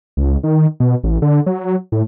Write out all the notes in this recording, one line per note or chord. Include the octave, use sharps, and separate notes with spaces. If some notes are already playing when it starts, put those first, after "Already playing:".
C#2
D#3
B2
A1
D3
F#3
A2